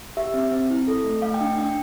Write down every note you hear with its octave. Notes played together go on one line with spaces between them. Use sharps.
G4 E5
C4
C4
E4
A4
A3
A3 F5
G5
D4
G5
D4 G5